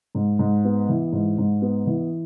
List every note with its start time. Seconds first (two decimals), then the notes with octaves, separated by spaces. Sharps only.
0.15 G#2
0.39 G#2
0.65 B3
0.89 E3
1.13 G#2
1.38 G#2
1.62 B3
1.87 E3